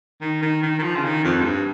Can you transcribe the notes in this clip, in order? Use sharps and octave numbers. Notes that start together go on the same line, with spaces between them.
D#3
D#3
D#3
D#3
F3
C#3
D#3
F2
G#2
G2